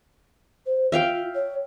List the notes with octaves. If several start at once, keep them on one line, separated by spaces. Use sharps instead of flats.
C5
F4 E5 F5 G5
C#5